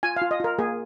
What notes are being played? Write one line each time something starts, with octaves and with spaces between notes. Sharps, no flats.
F4 G#5
F5
F4
D#5
F4 A#4
A#3 G#4